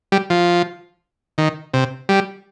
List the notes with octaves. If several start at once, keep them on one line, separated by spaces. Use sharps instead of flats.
G3
F3
D#3
C3
G3